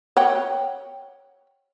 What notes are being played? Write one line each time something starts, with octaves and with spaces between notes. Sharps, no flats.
C#5 F#5 G5